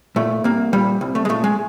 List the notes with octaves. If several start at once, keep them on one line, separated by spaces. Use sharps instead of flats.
A#2 A3
C2 A#3
A#2 G3
C2
A3
G#3
A#2 A3
G#3